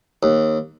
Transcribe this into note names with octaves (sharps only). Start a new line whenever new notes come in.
D#2